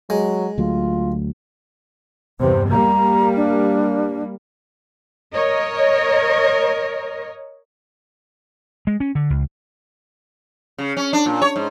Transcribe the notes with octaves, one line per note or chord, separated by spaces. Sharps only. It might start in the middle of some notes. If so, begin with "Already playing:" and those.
F#3 G#3
D2 F#3 A3 F4
E2 G2 C3 C5
G3 A#3 A#5
D4
A#4 C#5 D#5
G#3
C#4
D3
C#2
C#3
C#4
D4
A#2
C#5
G#2